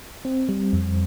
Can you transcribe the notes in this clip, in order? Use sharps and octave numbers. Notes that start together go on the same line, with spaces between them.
C4
G3
F2